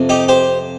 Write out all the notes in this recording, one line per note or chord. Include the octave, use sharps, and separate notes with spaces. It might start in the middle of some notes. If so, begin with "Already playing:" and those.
Already playing: F2 C3 F3
D#4 G4
G4 C5